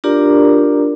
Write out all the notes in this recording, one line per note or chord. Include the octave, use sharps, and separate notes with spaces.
D4 F4 G4 A#4 D5 A#5